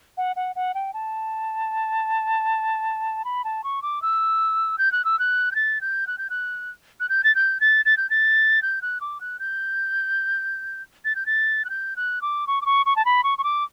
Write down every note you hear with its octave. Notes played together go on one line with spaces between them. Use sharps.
F#5
F#5
F#5
G5
A5
B5
A5
C#6
D6
E6
G6
F#6
E6
F#6
G6
A6
G6
F#6
G6
F#6
F#6
G6
A6
G6
A6
A6
G6
A6
G6
F#6
D6
F#6
G6
A6
G6
A6
F#6
G6
F#6
D6
C#6
D6
C#6
C#6
A5
B5
C#6
C#6
D6